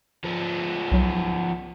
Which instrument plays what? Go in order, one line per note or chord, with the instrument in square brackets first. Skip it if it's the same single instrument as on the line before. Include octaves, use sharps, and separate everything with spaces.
[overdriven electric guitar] F3 B3
[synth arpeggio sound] C2 F#3